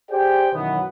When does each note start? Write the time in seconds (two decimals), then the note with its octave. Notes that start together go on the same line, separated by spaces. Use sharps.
0.11 G4 G#4 C5 D5 G5
0.53 F#2 B2 D#3 E3 F#3 B3